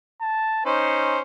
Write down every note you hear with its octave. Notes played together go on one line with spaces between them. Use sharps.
A5
C#4 D#4 C5